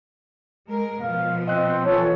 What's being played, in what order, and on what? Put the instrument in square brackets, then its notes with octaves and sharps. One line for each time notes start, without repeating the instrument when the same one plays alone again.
[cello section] G#3 A#4
[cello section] B2 F3 [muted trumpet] F5
[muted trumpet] C4 [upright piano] D#5 F#6
[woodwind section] E3 C#5 [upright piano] F4 [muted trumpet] A4